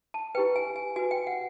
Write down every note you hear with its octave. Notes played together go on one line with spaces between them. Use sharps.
A5
E4 G4 B4 G5
G#5
G#5
F#4 B4 G#5
G5
F#5